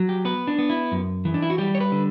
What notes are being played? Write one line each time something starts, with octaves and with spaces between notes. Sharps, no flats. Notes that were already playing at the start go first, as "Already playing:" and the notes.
Already playing: F#3
G4
B3 B4
D4
B3
E4
F#2
E3
D4
E4
F#4
G3 G4
C#5
B4
D3